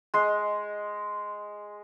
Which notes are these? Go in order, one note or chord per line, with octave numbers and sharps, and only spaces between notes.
G#3 C6